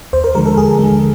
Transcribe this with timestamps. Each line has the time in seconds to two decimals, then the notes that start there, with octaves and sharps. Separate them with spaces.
0.13 D#2 C5
0.24 A#4
0.35 D3 F3 G#3 A#4
0.46 A4
0.57 D#2 G#4
0.79 D3 F3 G#3